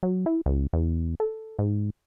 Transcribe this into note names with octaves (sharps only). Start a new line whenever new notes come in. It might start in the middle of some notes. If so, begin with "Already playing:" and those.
F#3
E4
C#2
E2
A4
G#2